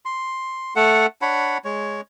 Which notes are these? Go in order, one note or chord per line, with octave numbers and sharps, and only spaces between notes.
C6
A3 A4 F#5
D4 C#5 F#5 B5
G#3 C#5